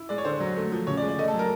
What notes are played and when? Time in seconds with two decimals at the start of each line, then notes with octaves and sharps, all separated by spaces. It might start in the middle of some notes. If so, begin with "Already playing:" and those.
Already playing: E4
0.09 G#3 D5
0.18 C#5
0.25 D3 C5
0.40 F#3
0.57 A3
0.72 F3
0.87 C#3 C#5
0.97 D5
1.02 G#3
1.08 D5
1.19 A3 D#5
1.28 A4
1.33 F#3
1.39 A#4